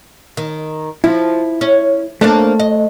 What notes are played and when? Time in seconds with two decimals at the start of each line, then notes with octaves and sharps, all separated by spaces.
0.37 D#3
1.04 F3 E4
1.61 C#4
2.21 A3 A#3 C4 D4
2.59 D#5